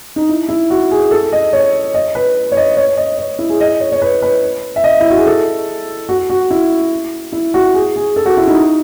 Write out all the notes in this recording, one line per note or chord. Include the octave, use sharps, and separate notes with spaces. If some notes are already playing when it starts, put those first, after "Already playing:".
D#4
E4
E4
F#4
G#4
A4
D#5
C#5
D#5
B4
C#5
D#5
C#5
D#5
C#5
E4
G#4
D#5
C#5
C#5
B4
B4
E5
D#5
E4
F#4
G#4
A4
F#4
F#4
E4
E4
F#4
G#4
G#4
A4
F#4
E4
D#4